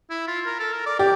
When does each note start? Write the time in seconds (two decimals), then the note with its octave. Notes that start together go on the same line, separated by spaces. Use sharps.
0.10 E4
0.28 F4
0.46 A#4
0.60 A4
0.73 A#4
0.86 D5
0.99 G4 D5